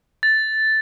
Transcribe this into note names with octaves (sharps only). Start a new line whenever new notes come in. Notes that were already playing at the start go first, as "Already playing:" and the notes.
A6